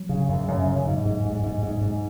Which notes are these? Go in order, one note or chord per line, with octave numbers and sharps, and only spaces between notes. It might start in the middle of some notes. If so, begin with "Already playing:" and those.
Already playing: F#3
C#3
F#2
F#2
C#3
G#2
G#2
G#2
G#2
G#2
G#2